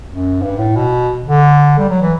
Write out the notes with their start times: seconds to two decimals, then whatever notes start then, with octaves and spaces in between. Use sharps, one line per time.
0.08 F#2
0.42 G2
0.58 A2
0.76 B2
1.27 D3
1.78 G3
1.89 F#3
2.01 E3